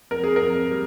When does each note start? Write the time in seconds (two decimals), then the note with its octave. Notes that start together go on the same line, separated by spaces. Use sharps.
0.11 F2 A#4
0.24 G#4
0.36 A#4
0.41 F2
0.71 G3